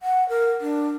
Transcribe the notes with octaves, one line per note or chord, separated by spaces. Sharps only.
F#5
A#4
D4